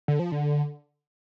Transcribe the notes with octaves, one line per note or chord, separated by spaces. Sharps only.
D3
F3
D3